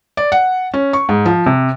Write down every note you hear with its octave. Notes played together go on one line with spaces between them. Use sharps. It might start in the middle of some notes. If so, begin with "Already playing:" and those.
D5
F#5
C#4
C#6
G#2
F3
C3